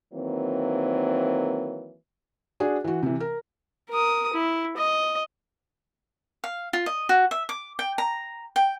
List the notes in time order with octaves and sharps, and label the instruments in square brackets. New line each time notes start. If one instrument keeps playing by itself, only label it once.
[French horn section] D#3 E3 F#3 A#3 C4
[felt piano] D4 F#4 G#4
E3 F#4
C3 E3
A#4
[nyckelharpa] A#4 D#6
E4
D#5
[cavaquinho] F5
F4
D#5
F#4
E5
D6
G5
A#5
G5